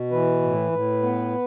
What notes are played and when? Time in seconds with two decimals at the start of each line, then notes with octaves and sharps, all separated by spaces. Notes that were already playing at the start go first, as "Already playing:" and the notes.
Already playing: B2
0.11 E3 B4
0.42 A2
0.72 A2
1.02 B3